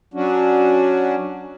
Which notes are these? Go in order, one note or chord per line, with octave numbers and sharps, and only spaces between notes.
F#3 C#4 D4 F#4